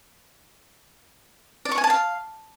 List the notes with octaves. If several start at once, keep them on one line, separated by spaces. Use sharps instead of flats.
D5
C#6
G#5
A5
F5